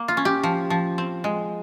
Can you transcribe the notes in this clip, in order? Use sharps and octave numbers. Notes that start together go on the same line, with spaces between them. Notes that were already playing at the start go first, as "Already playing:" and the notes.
Already playing: A#3
F4
C#4
G4
F3
F3
C4
G#3